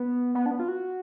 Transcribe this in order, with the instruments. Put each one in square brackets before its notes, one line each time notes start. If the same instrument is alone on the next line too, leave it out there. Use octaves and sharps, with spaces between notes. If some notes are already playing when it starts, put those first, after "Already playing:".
Already playing: [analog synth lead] B3
B3
D4
B3
F4
F#4